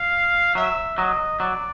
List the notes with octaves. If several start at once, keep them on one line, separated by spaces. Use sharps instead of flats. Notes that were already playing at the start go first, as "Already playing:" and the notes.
Already playing: F5
F#3 E5
F#3 D#5
F#3 D5